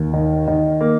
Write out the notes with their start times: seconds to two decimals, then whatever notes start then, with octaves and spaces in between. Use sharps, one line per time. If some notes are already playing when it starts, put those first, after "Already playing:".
Already playing: D#2
0.14 D#3
0.48 D#3
0.81 A#3